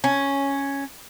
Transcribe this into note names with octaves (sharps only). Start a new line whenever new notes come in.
C#4